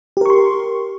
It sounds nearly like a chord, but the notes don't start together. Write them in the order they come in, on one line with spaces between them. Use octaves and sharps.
G4 A#4 C#6 C6